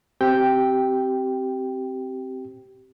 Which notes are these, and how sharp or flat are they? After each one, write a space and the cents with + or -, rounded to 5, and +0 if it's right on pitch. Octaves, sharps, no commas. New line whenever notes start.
C4 +0 G4 -25 G5 +0